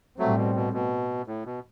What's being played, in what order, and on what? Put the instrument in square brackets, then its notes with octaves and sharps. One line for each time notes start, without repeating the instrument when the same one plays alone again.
[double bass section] A2 G3 C4 [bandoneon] F#3 A3
[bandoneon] B2
B2
B2
A2
B2